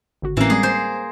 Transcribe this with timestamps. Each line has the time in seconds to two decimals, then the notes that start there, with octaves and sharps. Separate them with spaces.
0.22 G#1 D3 F#4
0.37 A2 E3 A#3 C4 C#4
0.50 G3 G#3 C4 G#4
0.63 C5